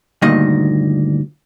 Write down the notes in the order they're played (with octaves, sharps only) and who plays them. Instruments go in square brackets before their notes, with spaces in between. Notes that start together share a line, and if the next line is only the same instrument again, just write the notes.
[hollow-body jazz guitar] D2 G2 A#2 D#3 D#5